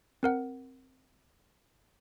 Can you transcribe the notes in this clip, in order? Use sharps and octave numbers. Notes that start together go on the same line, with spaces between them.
C4 A#4 F#5